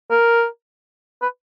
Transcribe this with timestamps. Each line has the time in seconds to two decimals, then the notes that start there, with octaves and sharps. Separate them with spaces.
0.11 A#4
1.22 B4